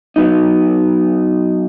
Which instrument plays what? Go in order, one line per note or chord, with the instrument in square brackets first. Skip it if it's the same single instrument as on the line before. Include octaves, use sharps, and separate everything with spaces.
[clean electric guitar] F#3 B3 D#4